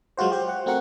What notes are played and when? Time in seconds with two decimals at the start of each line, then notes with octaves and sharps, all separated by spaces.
0.17 F#3 G#3 F4 F#4 C5
0.32 G4 C5
0.49 F#5
0.66 A3 C4 F#4 A#4 F#5